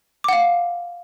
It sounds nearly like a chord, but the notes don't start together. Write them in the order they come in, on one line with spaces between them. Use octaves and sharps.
D6 F#5 F5